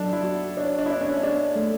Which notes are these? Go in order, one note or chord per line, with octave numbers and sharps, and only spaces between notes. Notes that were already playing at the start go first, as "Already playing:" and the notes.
Already playing: F#3 D4 A4
E4
F#4
D4 C#5
D4
E4
D4 E5
C#4
D4 G#4
A3